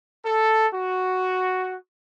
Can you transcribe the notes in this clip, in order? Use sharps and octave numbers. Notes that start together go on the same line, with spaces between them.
A4
F#4